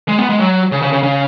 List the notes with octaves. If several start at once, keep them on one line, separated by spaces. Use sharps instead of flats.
G#3
B3
G#3
F#3
C#3
C#3
C#3
C#3